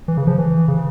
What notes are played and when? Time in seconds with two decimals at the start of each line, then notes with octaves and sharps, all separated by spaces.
0.08 E3
0.17 C#3
0.27 F3
0.38 E3
0.68 C#3